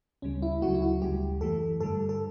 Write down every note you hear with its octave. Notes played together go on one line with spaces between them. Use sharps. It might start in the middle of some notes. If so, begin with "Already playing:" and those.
D2 C#3 G3 C#4
E4
D2 C#3 F#3 A3 F#4
E4
F#4
D2 C#3 G3 G4
F#2 E3 A3 A4
G2 D3 G3 A4
A4